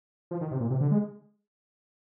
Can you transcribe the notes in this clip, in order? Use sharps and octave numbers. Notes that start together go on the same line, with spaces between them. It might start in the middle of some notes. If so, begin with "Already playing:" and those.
F3
D#3
C3
A#2
C3
D3
G#3